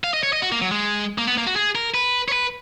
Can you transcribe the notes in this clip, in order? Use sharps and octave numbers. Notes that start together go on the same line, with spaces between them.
F5
D#5
C#5
D#5
F#4
A#3
F#3
G#3
A#3
B3
A#3
F#4
G#4
A#4
B4
C#5
B4